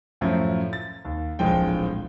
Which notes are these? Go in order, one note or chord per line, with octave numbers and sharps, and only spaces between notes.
F#2 A2 F3
A6
D#2
D1 A#1 F3 G#3 G5